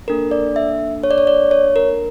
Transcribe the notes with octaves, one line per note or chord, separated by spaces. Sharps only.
A#3 D4 A4 A#4
D5
E5
C#5
D5
C#5
D5
C#5
A#4